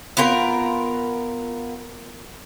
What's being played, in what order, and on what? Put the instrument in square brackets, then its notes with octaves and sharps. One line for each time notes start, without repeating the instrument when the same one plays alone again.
[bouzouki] B3 F4 A#4 G5